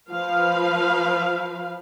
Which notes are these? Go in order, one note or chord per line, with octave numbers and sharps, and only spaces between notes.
F3 B4 F5